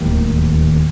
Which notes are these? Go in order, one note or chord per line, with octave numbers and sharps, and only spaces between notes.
D1 D#2